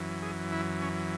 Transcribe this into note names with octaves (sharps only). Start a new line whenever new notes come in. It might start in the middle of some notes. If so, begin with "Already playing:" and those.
Already playing: F#2 E3
G#4
E4
C#4